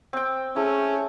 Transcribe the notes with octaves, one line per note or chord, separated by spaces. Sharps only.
C4 G5
A3 C#4 E4 G#4